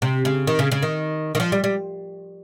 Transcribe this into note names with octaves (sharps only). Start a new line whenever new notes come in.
C3
C#3
D#3
C#3
C#3
D#3
D#3
F3
G3
G3